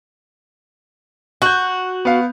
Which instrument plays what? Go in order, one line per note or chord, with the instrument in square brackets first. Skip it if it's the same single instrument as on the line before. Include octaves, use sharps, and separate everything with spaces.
[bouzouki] F#4 [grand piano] F#6 G6
[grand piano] B3 F5